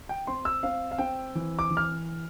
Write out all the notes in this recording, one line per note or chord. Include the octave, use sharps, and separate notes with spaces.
G5
C4 C6
E6
C4 F5
F5
C4 G5
E3
D6
E3
F6